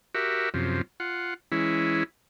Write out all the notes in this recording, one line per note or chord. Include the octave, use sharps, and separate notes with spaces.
F#4 G4 A#4 E5
F#2 C3 F3
F4 F#5
E3 G#3 C#4 E4